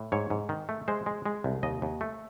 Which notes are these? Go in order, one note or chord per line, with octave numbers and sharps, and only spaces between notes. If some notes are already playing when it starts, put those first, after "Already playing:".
Already playing: A2
G#2 C#5
G#2
D#3
A3
G#3 C5
G#3
G#3
C2
D#2 D#5
D#2
A3